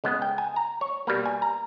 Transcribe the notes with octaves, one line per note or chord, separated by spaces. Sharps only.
C#3 G#3 B3 D#5
G5
G#5
A#5
C#5
B2 G3 A#3 B4
G#5
A#5